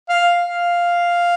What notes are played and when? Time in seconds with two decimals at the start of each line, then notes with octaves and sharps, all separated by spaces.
0.09 F5
0.47 F5